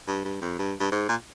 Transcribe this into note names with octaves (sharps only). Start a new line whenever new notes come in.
G2
G2
F2
G2
G2
G#2
A#2